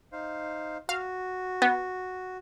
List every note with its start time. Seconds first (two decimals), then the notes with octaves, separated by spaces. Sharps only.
0.12 D#4 C5 F5
0.89 F#4 F5
1.62 B3